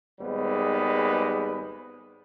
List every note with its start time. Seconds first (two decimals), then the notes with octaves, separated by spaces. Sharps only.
0.20 G#1 D#2 G3 G#3 B3